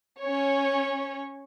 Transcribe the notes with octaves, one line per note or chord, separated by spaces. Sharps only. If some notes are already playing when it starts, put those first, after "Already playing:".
C#4 C#5